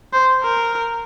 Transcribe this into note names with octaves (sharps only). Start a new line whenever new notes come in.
C5
A#4